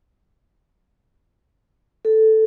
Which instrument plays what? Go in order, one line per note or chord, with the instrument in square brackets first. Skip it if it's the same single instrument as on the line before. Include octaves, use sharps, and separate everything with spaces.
[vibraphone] A4